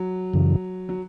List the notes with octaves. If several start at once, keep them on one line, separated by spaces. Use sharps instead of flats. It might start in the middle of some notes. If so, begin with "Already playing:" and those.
Already playing: F#3
F#2 C#3 E3
F#3